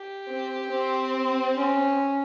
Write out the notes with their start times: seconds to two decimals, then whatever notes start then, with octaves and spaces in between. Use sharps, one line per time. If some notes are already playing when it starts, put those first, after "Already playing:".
Already playing: G4
0.27 C4
0.70 C4
1.55 C#4